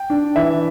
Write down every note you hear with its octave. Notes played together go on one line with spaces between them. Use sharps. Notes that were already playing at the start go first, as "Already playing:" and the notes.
Already playing: G5
D4
E3 E5